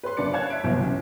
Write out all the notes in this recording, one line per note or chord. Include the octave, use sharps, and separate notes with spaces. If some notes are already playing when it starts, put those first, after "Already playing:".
B4 C#5 C6
F#1 D4 B4 D5 C#7
C#5 F5 A5 F#6 G#6
E5 D7
G1 C2 B2 E3 F#3
C#3